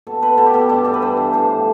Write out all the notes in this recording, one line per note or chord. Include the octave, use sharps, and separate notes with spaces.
B2 A4
B2 B4
B2 A4
G4
B2 A4
G2 D5
E3 A4
B4
G2 C5
E3
A2 C5
F3